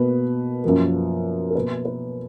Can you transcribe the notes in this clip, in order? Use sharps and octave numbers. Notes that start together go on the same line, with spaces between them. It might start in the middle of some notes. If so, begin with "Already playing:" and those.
Already playing: B2 A#3 B4
F#2 F3 A#3
A#4
B2 A#3 B4
B4